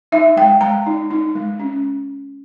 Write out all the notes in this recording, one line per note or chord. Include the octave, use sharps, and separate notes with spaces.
D#4 E5
G#3 G5
G#3 A#5
D#4
D#4
G#3
C#4